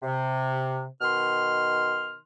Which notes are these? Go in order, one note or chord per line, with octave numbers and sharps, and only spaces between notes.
C3
B2 D#3 C6 F6